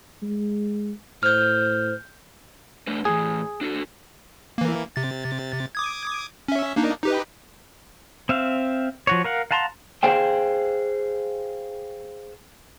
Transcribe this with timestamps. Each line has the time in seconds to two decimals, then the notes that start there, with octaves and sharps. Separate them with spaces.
0.23 G#3
1.23 A2 C5 F6 G6
2.87 A3 D4 B4
3.05 A2 E3 G#4
3.61 D4 F#4 A4
4.58 E3 A#3
4.96 C3 A6
5.75 D6 D#6 G#6
6.48 C#4 E5
6.76 A#3 D4 D#4
7.03 D#4 G4 B4
8.29 C4 E5 F5
9.07 F3 F#4 C#5
9.24 A#4 F5 F#5
9.51 F5 F#5 A5 A#5 C6
10.03 G#4 C5 F5 G5